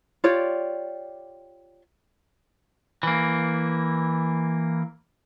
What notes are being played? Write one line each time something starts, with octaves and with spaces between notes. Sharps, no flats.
F4 G4 C#5 D5
E3 A#3